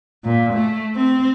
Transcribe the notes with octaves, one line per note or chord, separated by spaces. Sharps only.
A#2
A3
C4